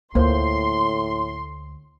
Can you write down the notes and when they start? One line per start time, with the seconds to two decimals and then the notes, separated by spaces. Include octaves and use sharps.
0.15 D2 A2 A#3 C5 C6